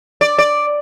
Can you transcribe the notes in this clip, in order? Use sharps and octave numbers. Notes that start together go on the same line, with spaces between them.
D5
D5